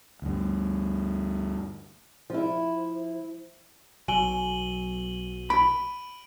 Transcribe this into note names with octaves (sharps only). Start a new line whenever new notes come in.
D2 G2
F3 E4
B1 F#3 G#5 D#7 F#7 G7
B5 D7